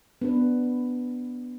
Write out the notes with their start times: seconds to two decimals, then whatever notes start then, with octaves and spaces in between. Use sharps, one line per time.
0.22 B3 D4 B4